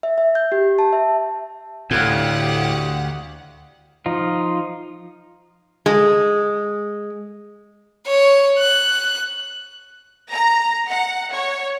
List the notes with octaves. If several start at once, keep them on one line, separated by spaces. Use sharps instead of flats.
E5
E5
G6
G4
A5
E5
D2 A2 G4 F5 F#5
F3 D#4 F4
G#3
C#5
F#6
A#5
F#5
C#5